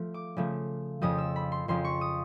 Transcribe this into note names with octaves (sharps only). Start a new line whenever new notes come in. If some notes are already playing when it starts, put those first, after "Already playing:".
Already playing: F3 A3
D6
C#3 F3 A3
F2 C#3 F3 D#6
E6
B5
C6
F2 C#3 F3 C6
C#6
D#6